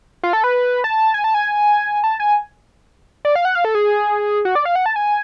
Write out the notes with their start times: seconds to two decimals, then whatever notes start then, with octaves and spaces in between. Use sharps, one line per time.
0.23 F4
0.33 A4
0.44 B4
0.84 A5
1.14 G#5
1.24 A5
1.34 G#5
2.04 A5
2.20 G#5
3.25 D5
3.35 F5
3.45 F#5
3.55 F5
3.65 A4
3.75 G#4
4.45 F#4
4.55 D5
4.65 F5
4.76 F#5
4.86 A5
4.96 G#5